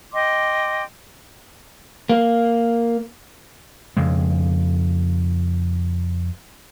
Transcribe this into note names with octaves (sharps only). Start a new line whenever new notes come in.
D#5 G5 C6 D6
A#3
F2 C#3 G#3